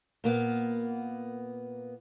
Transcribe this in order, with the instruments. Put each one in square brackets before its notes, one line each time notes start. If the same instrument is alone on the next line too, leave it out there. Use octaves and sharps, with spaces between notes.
[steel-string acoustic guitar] A#2 A#3 B3